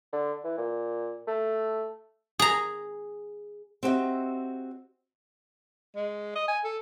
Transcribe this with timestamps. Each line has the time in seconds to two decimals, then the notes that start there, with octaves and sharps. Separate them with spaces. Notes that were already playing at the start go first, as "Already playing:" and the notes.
0.13 D3
0.44 E3
0.58 A#2
1.27 A3
2.39 G#4 A#5
3.83 C4 F#4 G4 A#4 D#5 E5
5.95 G#3
6.35 D#5
6.48 G#5
6.64 A4